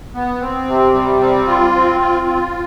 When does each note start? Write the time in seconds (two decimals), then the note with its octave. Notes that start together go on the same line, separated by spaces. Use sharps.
0.15 B3
0.41 C4
0.67 C3
0.95 G3
1.21 C4
1.47 F4
1.74 C4
2.00 F4
2.26 F4